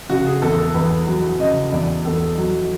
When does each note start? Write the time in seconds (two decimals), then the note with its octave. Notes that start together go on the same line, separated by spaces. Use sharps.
0.10 C#3 F#4
0.27 G#4
0.42 E2 A4
0.59 A4
0.74 E2 B4
1.07 F#3
1.39 C#3 D#5
1.72 E2 D5
2.05 E2 A4
2.38 F#3